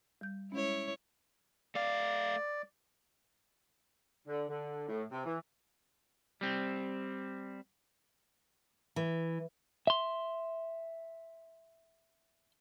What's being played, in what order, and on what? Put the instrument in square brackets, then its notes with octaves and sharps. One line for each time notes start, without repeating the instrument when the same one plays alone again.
[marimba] G3 G6
[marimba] G#3 C#4 [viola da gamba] E4 C#5
[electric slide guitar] A3 F5 [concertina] D5
[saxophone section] D3
D3
A2
C3
E3
[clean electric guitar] G3 C4
[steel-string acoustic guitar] E3
[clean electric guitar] E5 C6